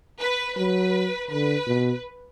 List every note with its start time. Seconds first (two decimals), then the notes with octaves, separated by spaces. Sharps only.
0.20 B4
0.57 F#3 B4
1.31 D3 B4
1.67 B2